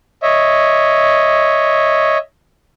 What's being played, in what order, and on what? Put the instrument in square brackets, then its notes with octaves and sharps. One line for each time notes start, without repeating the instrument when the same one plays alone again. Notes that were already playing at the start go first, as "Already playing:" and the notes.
[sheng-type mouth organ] C#5 D#5 E5